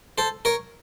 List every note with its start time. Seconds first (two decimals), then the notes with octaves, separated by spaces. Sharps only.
0.18 A4 C5
0.45 A#4 C#5